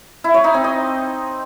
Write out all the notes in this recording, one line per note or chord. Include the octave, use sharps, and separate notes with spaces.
E4
C#5
D#4
C4
D#5